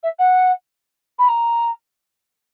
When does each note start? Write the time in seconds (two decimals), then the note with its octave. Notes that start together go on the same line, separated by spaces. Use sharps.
0.03 E5
0.19 F#5
1.19 B5
1.28 A#5